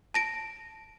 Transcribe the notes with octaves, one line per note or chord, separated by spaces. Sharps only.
A5 A#6 D7